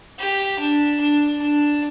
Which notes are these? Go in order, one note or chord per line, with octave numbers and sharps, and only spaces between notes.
G4
D4
D4
D4